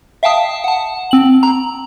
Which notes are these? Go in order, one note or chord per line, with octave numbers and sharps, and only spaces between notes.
E5 F5 G5 A5 D#6
F#5 A5
C4 F#7
A#5